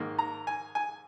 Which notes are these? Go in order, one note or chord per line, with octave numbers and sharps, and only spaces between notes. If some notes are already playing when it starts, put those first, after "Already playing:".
Already playing: G#2 D#3 A#3
A#5
G#5
G#5